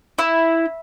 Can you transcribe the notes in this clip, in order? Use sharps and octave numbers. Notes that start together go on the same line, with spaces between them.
E4